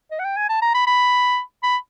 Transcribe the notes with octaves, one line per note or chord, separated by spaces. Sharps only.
D#5
F#5
G5
G#5
A5
A#5
B5
B5
B5